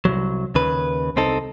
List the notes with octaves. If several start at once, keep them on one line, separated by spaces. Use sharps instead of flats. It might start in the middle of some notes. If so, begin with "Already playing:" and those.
C2 G#2 F#3
D#2 C#3 B4
C2 C4 D#4 A4